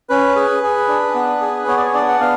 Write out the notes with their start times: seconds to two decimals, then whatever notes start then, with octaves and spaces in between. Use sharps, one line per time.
0.10 C#4 B4
0.36 G#4
0.63 G#4
0.88 D4
1.15 B3
1.41 G#4
1.67 B3 C#5
1.77 D5
1.85 C#5
1.94 D4 D5
2.08 F#5
2.20 B3 F5